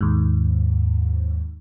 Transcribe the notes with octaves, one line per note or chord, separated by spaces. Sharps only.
D#2 G#2